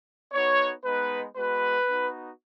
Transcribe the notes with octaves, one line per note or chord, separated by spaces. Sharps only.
B3 D#4 F#4 C#5
G#3 B3 D#4 B4
G#3 B3 F#4 B4
B3 D#4 F#4